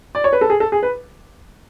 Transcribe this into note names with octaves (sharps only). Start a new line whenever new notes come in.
D5
C#5
B4
A4
G#4
A4
G#4
B4